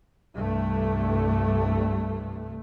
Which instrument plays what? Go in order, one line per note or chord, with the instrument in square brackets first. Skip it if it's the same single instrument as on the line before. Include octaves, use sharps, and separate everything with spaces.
[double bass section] C2 G2 A3